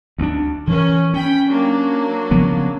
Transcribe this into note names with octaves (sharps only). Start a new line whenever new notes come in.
D2 B3 D4
E3 C#4 A#4
C#4 G5 B5
F#3 A#3 D4
C#3 F3 B3